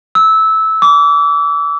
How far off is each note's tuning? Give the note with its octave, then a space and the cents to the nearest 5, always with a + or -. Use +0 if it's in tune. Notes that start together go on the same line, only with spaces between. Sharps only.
E6 -15
D6 -35